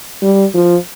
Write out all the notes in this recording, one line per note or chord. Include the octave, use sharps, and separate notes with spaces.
G3
F3